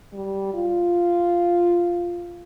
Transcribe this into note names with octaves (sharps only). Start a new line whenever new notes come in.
G3
F4